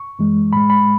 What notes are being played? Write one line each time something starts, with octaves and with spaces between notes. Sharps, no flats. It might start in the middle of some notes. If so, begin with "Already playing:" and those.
Already playing: C#6
F#2 E3 G#3
A2 G#3 B5
B5